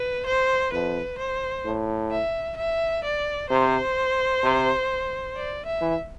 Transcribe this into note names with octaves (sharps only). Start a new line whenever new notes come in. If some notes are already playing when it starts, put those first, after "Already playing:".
Already playing: B4
C5
F2 B4
C5
A2
E5
E5
D5
C3 C5
C3
D5
E5
E3